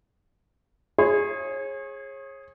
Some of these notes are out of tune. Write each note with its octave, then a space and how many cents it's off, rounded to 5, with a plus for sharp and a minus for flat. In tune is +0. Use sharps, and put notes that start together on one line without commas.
G#4 +0 C#5 -35